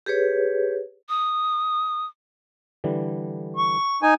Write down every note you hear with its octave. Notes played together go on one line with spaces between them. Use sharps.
G4 G#4 B4 C#5
D#6
D3 E3 G3
C#6
D#4 G#5